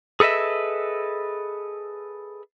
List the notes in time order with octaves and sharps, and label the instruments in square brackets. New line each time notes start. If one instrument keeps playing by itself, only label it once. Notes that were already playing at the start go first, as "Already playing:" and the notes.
[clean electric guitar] G#4 A4 B4 D#5 E5